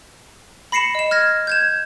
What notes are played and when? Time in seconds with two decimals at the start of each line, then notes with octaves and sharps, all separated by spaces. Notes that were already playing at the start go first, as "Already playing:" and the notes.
0.72 B5 A#6 C7 C#7 E7
0.95 D#5 E7
1.11 F6 G#6 A#6
1.47 G6 G#6 E7